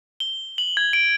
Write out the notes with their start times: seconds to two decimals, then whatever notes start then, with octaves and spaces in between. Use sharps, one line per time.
0.20 G7
0.58 F#7
0.77 G#6
0.93 D7